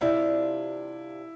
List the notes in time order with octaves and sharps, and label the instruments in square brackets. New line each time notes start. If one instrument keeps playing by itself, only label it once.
[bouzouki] C3 G3 D4 F4 [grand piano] E4